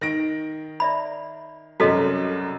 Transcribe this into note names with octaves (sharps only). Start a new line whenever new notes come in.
D#3 A#6 D7
D5 E5 B5
C2 F#2 F#4 A4 D#5